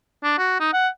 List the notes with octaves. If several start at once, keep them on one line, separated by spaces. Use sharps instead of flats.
D4
F#4
D#4
F#5